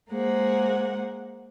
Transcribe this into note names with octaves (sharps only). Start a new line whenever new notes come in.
G#3 A#3 G#4 C5 F#5